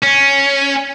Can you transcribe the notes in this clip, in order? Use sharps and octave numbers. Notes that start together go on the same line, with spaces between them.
C#4